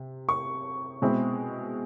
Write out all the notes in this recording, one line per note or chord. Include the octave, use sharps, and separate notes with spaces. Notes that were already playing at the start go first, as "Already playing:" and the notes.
Already playing: C3
C#6
B2 G#3 C4 E4